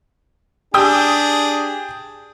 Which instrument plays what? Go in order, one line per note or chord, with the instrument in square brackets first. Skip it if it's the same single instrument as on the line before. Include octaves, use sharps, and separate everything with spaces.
[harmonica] D4 G#4 [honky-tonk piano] G4 D#6 G6